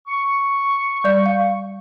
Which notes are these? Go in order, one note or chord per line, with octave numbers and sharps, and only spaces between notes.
C#6
G3 D5 G6
F5